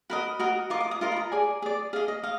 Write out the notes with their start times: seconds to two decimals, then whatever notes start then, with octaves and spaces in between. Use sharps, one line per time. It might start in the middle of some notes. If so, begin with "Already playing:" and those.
0.10 F#4 A#4 D#5 B5
0.39 F#4 A#4 D#5
0.70 F4 A#4 D#5 D6
0.81 D6
0.91 D#6
1.01 F4 A#4 D#5
1.12 B5
1.16 A#5
1.32 G#4 D5 G#5
1.62 G#4 D5
1.93 G#4 F5
1.96 D#5
2.08 D#5
2.23 D#5 F5